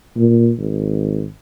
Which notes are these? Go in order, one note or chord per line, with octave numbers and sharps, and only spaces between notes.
A#2
G#1